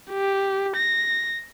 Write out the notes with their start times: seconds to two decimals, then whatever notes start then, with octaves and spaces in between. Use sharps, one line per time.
0.11 G4
0.76 A#6